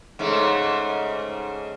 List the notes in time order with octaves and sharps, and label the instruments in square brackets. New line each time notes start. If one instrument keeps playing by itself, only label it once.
[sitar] G#2 C#3 A3